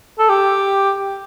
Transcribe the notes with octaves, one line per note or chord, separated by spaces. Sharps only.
A4
G4